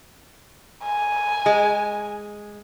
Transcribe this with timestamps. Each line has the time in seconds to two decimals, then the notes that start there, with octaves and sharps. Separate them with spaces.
0.83 G#5
1.46 G#3